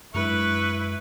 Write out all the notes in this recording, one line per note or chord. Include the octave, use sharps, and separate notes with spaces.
F#2 G#3 D4 E4 B4 C#6